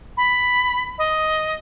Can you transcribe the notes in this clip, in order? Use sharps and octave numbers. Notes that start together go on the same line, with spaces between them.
B5
D#5